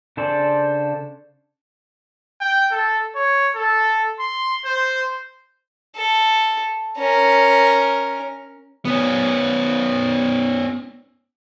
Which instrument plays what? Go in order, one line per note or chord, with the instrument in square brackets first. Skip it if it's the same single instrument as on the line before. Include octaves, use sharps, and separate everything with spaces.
[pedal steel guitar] C#3 D4 A4 C5 D5
[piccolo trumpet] G5
A4
C#5
A4
C6
C5
[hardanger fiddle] A4
C#4 A#4
[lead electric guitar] B3 C#4